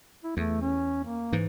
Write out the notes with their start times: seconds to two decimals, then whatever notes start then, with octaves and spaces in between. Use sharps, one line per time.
0.24 E4
0.37 E2 A3
0.61 C#4
1.04 A#3
1.33 G#2 E3